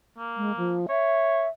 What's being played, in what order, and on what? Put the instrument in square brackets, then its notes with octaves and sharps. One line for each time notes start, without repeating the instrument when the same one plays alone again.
[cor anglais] A#3
[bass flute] G#3
F3
[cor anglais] C#5 [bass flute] E5